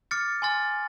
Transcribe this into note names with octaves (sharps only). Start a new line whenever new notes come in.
D6 F6 A6 C#7
G#5 C6 F6 A6